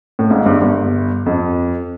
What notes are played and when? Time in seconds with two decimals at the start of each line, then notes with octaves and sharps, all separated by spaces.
0.19 A2
0.30 G#1 G#2
0.45 G1 G2
0.61 G1 G2
1.26 F2